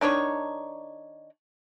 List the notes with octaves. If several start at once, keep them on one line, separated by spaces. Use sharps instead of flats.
D#3 D4 D#4 C#5